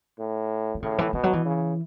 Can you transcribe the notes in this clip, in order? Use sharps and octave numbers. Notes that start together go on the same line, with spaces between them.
A2
E3
A2 C#3
E3
B2 E3
F#3
E3
C#3